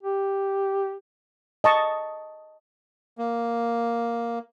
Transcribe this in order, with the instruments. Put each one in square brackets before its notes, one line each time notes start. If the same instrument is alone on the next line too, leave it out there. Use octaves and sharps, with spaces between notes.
[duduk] G4
[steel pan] D#5 A5 C#6
[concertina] A#3